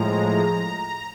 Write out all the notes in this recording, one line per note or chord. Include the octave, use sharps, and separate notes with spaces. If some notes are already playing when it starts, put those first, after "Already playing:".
Already playing: A2 F3 G#3 A#5